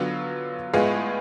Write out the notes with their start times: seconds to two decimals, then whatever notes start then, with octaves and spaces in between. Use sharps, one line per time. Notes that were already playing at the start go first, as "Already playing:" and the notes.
Already playing: D3 F#3 B3 F4
0.73 A2 G#3 B3 F4 G#4